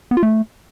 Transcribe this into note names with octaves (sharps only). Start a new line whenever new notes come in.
B3
F4
A3